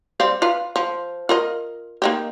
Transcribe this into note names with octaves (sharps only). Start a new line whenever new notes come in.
G3 C4 F5
F4 B4 F5
F3
F4 A#4 D#5
A#3 D#4 G4